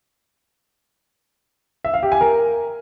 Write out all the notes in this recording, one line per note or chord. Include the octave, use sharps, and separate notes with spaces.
E5
F5
G4
G#5
A#4